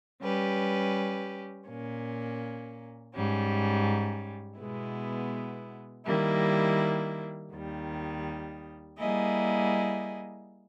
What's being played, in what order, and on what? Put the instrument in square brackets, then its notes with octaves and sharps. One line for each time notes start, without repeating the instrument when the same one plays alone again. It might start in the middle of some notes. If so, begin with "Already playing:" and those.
[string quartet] G3 C#4 G4 B4
A#2 A#3 C#4
G#2 G3 C#4
B2 G#3 B3 E4
D#3 G3 A#3 E4
D#2 D#3 G3
G3 A#3 E4 G#4 D#5